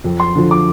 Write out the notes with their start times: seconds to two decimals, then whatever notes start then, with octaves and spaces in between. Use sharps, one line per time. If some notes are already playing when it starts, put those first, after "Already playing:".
0.04 F2
0.20 C6
0.35 D3 F3
0.51 D6